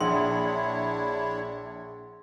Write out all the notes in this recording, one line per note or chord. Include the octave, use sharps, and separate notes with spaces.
A#1 D4 E4 G#4 C#5 F#5 C6